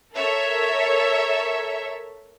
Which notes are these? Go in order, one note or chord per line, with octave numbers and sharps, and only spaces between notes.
A4 A#4 C#5 E5